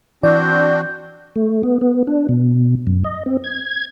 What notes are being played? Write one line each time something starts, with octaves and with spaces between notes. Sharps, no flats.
E3 C4 D4 F#4 D5 G6
A3
B3
B3
D4
B2
F#2
D#5
C4
G#6